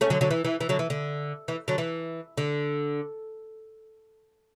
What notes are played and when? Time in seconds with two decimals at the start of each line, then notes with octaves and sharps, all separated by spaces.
0.01 A3 C#4
0.10 D3 F#3
0.21 D3 F#3
0.31 E3
0.45 E3
0.61 E3
0.69 D3 F#3
0.79 E3
0.90 D3
1.48 E3
1.68 D3 F#3
1.78 E3
2.37 D3